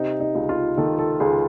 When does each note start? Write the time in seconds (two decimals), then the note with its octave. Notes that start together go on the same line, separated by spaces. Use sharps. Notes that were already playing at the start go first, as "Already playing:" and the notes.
Already playing: C3 D#4
0.20 D#4
0.35 C#2
0.49 F4
0.77 D#3 A4
0.99 A4
1.20 C#2 G#4